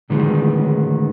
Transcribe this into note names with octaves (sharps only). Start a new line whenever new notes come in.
A2 D3 D#3 F3 G#3 B3